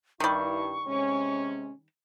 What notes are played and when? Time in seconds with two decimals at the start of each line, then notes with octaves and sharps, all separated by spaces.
0.20 G2 D#3 G3 E4 C#6
0.86 C3 G#3 C#4